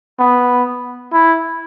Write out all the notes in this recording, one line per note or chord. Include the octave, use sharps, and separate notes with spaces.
B3
E4